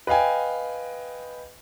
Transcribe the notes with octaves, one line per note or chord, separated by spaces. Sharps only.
B4 D#5 F5 G5 G#5